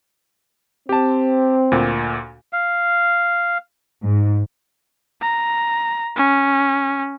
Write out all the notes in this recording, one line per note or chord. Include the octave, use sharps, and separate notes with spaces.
C4 G4 A5
D2 A#2
F5
G#2
A#5
C#4